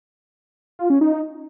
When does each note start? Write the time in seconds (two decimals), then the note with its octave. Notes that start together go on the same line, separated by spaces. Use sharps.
0.79 F4
0.90 C#4
1.01 D#4